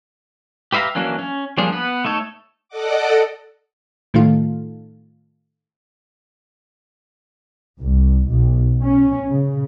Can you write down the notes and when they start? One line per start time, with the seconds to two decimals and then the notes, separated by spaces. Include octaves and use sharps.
0.72 G4 B4 E5 F5 A#5
0.95 E3 F#3 A#3 C#4 D4
1.19 C#4
1.58 F3 G3 A#3 D4 G#4
1.73 B3 B4
2.05 A3 D#4 A4 C#5
2.68 A4 D5 D#5 F#5 D6
4.14 A2 D#3 A3 F4
7.79 C2
8.28 B1
8.83 C#4
9.30 C#3